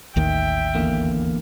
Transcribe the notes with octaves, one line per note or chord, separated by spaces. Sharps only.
A1 D#2 D#3 E5 G5
E2 D3 A#3